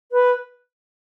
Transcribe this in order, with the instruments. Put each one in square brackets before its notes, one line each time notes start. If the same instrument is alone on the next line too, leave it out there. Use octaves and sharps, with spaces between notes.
[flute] B4